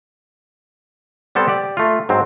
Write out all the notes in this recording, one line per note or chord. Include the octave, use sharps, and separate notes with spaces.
G3 B3 C4 A4
G4 D5
A3 F4
G#2 F#3 C4